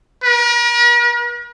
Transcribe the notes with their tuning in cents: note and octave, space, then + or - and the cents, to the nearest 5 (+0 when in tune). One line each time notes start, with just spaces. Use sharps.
A#4 +45